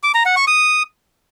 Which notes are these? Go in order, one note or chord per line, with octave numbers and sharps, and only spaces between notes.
D6
A#5
F#5
C#6
D#6